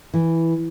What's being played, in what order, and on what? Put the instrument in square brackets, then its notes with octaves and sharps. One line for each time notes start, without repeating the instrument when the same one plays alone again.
[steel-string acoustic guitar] E3